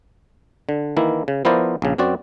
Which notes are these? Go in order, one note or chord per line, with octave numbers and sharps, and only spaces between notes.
D3
D#3 E3 A#3 E4
C#3
F3 B3 E4 A#4 C5 D5
A#1 C#3
F#2 C4 F#4 D5